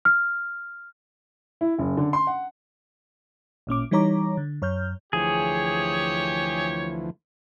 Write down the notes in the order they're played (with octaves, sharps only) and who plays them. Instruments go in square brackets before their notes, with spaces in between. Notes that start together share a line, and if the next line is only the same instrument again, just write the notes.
[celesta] F6
[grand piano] E4
F#1
D3
C6
F#5
[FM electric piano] A1 A#2 C#4 D6
E3 G3 D#4 C#5 A#5 D6
D3
F#2 C#5 F6 G6
[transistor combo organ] D2 E3 F3 [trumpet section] G4 C#5 [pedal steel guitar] G#4